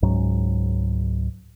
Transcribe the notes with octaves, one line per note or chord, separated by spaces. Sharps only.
C#2 G#2 F#3 C#4